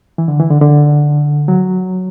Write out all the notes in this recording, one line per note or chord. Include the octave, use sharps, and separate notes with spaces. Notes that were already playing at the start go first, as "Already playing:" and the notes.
E3
D3
E3
D3
D3
F#3